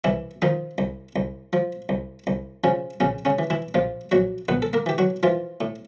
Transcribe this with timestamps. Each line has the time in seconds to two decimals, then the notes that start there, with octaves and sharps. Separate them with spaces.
0.04 C2 E3 E4
0.42 D#3 F3 D#4
0.78 C2
1.16 C2
1.53 F3
1.89 C2
2.27 C2
2.64 C#3 F3 C#4
3.00 A#1 C#3 C#4
3.25 C#3 C#4
3.39 E3
3.50 E3 E4
3.74 A#1 F3 F4
4.11 A#1 F#3 F#4
4.49 A#1 B3 B4
4.62 A4
4.73 A#3 A#4
4.86 E3 G4
4.98 F#3 F#4
5.23 E3 F3 F4
5.61 A2